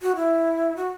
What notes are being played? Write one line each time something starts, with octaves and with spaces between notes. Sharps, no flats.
F#4
E4
F#4